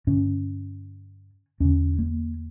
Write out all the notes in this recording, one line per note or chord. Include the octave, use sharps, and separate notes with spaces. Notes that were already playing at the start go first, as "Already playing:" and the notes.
G2 D3 C#4
E2 D3 C#4
A#3